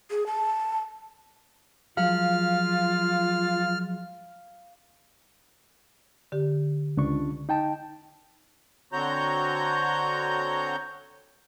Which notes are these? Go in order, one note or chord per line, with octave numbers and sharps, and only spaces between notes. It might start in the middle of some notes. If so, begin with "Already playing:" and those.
G#4
A5
F3 F#3 G#3 F4 F5 F6
D3 G4
C#2 D4 C#6
D#4 G5 A5
D3 C4 F#4 C#5 A#5 G6